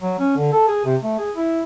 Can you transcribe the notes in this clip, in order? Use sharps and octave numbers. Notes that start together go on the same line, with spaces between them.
F#3
C#4
D3
A4
G#4
C3
A3
G#4
E4